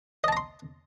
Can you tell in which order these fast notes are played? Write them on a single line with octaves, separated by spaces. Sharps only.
D#5 A5 A#5 C6